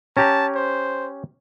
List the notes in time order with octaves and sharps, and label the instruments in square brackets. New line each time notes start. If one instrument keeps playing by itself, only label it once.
[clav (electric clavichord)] C#4 G4 A#5 [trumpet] A5
[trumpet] C5